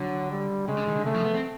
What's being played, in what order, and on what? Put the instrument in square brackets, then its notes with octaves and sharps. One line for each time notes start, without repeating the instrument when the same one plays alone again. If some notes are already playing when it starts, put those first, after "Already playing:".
Already playing: [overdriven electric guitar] D3 [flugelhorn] F#3
[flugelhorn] G3
[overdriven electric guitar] C#3 [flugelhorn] G#3
[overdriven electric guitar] D3
D#3
D3
[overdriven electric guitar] C#3 [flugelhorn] A3
[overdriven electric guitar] F3
B3
C4